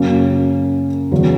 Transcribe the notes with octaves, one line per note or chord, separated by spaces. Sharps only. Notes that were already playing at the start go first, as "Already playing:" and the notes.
Already playing: F#2 C#3 F#3 A#3 C#4
E2 C#3 F#3